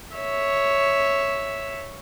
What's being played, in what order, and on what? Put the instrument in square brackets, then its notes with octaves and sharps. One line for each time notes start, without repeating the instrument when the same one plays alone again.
[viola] C#5 E5